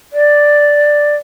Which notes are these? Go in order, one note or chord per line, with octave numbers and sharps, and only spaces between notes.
D5